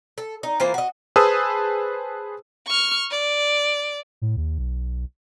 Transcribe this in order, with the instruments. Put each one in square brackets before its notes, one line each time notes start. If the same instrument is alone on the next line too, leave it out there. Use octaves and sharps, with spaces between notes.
[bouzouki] A4
D#4
E3 A#3 F4 C5
F#4 D#5
[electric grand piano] G#4 B4 C5 A5 D#6 E6
[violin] C#6 F6
D5
[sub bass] A2
D#2
B1